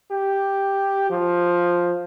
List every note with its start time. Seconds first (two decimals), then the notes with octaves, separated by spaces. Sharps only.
0.12 G4
1.10 F3